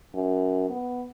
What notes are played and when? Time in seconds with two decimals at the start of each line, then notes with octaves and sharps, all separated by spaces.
0.14 F#2
0.70 B3